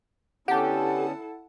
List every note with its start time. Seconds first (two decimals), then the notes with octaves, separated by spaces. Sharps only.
0.48 D3 B3 C#4 E4 G4 A4 F#5 A5